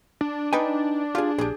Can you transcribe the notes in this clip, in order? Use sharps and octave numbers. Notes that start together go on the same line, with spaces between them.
D4
D#4 B4 G5 G#5
F4 G4 G#4
A#1 G4 G#4